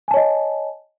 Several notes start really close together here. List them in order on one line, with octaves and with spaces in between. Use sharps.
G#5 A5 C#5 D#5